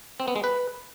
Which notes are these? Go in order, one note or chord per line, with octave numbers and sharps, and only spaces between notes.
C4
B3
G#3
B4